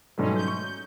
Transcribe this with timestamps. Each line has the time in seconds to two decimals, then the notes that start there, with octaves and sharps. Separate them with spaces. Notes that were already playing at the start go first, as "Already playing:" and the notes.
0.18 G#2 B2 F#3 G3 A3 C#4
0.35 G6
0.47 C#6